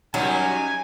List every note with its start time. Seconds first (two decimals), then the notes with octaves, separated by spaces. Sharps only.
0.14 F#2 F#3 G3 D#4 G#5